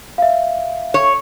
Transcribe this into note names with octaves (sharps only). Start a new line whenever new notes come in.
E5 F5
C#5